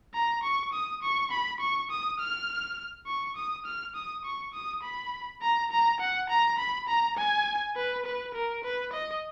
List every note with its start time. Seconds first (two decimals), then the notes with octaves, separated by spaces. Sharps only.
0.14 A#5
0.43 C#6
0.73 D#6
1.02 C#6
1.31 B5
1.60 C#6
1.91 D#6
2.20 F6
3.07 C#6
3.36 D#6
3.66 F6
3.95 D#6
4.24 C#6
4.54 D#6
4.83 B5
5.42 A#5
5.71 A#5
6.00 F#5
6.30 A#5
6.59 B5
6.88 A#5
7.17 G#5
7.76 B4
8.05 B4
8.35 A#4
8.64 B4
8.93 D#5